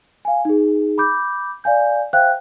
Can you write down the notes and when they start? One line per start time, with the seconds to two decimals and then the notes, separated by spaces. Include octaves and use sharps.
0.25 F5 G#5
0.45 D#4 G#4
0.98 B5 D6 G6
1.64 D5 F5 G#5 G6
2.13 C5 E5 F5 G5 F#6